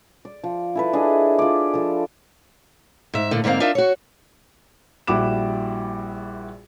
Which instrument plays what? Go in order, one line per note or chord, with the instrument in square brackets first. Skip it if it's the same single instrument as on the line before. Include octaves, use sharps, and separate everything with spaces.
[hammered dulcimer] D5
F3
E4 A4 B4
D4 E4 G#4 D#5
F4 D5
F3 A4
[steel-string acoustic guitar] G#2 E5
A2 D3 A#3
G#2 D3 A#3 C4 F5
D4 D#4 F4 A#4 E5
F#4 C#5
[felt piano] A#1 G3 E4 F#4 D6 E7